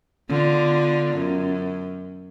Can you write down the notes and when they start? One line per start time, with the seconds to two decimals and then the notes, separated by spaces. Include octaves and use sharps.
0.29 D3 B3 F4
1.17 F#2